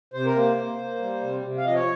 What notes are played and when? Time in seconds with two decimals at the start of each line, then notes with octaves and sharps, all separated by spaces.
0.14 C3 C5
0.26 A#4
0.35 A#3 C5
0.57 A#3
0.78 A#3
0.99 G3
1.21 C3
1.42 C3
1.57 F5
1.64 F3 D#5
1.75 C#5